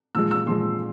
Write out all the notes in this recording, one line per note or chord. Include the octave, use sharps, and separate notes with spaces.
A#2 F3 G#3 E6
E6
A#2 F3 G#3 C6